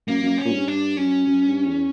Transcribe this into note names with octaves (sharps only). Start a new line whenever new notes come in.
F#2 A#3
F#2
C#4
A#2
G2
G2 D4
F#2 C#4
F#2
G2
E2